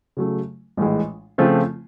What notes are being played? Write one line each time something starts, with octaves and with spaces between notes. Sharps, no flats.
C#3 F#3 A3
A#1 A2 E3 G#3
C#3 F3 A3 C4 F4